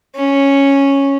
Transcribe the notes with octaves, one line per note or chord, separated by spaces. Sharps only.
C#4